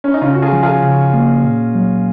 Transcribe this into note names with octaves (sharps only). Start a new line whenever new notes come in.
C#4
D#4
C#3 C#4 F4
F#4
F4 G#4
F3
F4 G#4
C#3
A#3
A#2
F#3